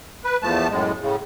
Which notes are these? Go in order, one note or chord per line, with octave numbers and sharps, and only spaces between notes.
B4
E2 F3 A3 A5
F#2 A2 G#3
A2 C#3